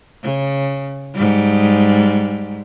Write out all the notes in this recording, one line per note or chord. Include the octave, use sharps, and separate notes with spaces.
C#3
G#2 G3